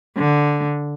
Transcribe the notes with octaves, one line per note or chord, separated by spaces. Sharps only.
D3